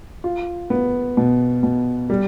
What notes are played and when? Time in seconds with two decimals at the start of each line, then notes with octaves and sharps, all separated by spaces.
0.24 F4
0.70 B3
1.17 B2
1.63 B2
2.10 G3